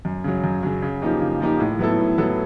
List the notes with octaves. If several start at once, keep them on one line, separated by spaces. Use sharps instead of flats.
F#2
C#3 F#3
F#2
C#3 F#3
C#3
F3 A#3 D#4 G4
C#3
F3 A#3 D#4 G4
A2
F#3 B3 E4 A4
A2
F#3 B3 E4 A4